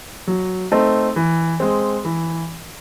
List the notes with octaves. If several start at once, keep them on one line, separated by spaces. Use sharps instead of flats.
F#3
A3 C4 D#4
E3
G#3 C4
E3